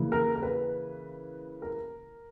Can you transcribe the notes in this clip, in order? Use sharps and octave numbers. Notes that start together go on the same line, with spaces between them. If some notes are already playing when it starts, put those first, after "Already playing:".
Already playing: C#3 E3 A#3
A#4
A#4
B4
A#4